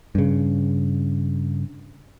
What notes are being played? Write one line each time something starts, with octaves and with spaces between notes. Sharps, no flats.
G2 C#3